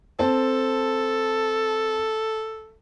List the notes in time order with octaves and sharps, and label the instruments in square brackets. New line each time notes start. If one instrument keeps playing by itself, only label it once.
[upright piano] C4 A5 [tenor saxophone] A4